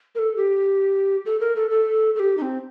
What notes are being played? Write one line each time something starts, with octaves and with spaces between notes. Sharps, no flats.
A#4
A4
G4
A4
A#4
A4
A4
A4
G4
D#4
C4